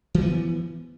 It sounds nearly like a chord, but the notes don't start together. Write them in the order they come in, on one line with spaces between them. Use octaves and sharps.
E3 F3 B3